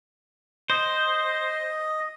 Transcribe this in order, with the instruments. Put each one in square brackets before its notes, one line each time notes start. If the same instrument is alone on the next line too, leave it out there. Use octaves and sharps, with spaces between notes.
[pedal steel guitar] C5 [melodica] D#5